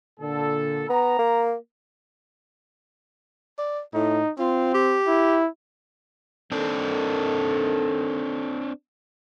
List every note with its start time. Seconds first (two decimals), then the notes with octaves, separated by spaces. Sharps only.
0.20 A#2 D3 A4
0.89 B3 A#5
1.19 A#3
3.58 D5
3.94 A2 D#4
4.39 C4 F4
4.74 G4
5.08 E4
6.52 D#3 C4 D4 A4